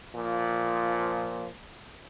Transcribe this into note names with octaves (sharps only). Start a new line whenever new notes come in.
A#2 F3